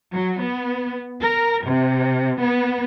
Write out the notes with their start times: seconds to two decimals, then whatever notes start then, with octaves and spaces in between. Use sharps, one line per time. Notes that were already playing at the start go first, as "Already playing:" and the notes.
0.12 F#3
0.42 B3
1.22 A#4
1.67 C3
2.40 B3